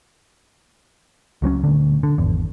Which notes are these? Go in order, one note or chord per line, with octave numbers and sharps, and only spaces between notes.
C#2 F#3 C4 C#4
D#1 D2 D3
D3
G#1 E2